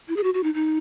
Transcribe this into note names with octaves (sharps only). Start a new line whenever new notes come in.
E4
G#4
F#4
F#4
D#4
D#4